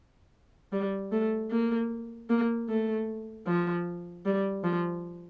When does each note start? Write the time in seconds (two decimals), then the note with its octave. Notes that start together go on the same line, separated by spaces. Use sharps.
0.72 G3
1.12 A3
1.51 A#3
2.30 A#3
2.69 A3
3.47 F3
4.26 G3
4.64 F3